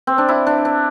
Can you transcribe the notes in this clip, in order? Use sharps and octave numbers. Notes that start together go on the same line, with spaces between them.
C4
D4
E4
D4
D4